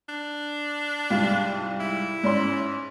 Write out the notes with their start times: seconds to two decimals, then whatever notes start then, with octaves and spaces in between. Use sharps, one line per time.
0.09 D4
1.10 C2 G#2 F4
1.80 E4
2.23 G#2 C#4 C6